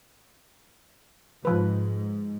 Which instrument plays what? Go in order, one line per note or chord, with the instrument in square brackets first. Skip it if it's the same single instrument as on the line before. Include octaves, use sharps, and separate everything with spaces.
[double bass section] G#2 [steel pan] F3 B4